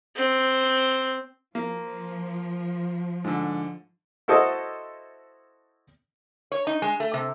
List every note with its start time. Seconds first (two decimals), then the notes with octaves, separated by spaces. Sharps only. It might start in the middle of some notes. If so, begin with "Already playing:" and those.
0.16 C4
1.55 F3 A#3
3.24 G#2 D3
4.28 E4 F#4 A4 C5 D#5 D#6
6.52 C#5
6.67 D#4
6.82 G#3
7.00 A3
7.14 C3